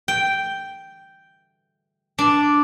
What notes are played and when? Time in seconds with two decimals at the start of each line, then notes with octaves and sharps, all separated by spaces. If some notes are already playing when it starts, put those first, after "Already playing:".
0.08 G5
2.19 D4